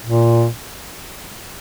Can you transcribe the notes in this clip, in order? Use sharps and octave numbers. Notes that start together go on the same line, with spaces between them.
A#2